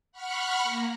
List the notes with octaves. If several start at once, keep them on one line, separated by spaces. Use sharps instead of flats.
F#5 B5 C#6 F6 F#6
A#3 A#4